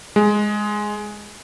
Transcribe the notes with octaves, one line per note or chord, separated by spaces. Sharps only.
G#3